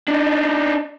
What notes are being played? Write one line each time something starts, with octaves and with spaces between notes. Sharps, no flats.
D4 D#4